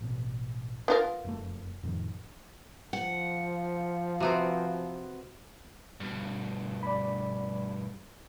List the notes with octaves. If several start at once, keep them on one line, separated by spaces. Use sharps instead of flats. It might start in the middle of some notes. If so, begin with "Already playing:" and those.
A1 B2
B3 F4 A#4
F1 F#2 A3
F2 A2 D#3
F3 F#5
C3 B3 C4 F#4
G2 B2
D5 B5